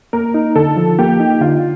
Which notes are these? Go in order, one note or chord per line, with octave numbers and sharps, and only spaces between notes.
A#3 A#4
D#4
D3 A4
F3
A#3 G4
D#4
D3 F4